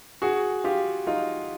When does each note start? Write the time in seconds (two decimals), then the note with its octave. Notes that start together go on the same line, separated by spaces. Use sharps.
0.22 F#4 G#4
0.64 F4 G4
1.07 D#4 F4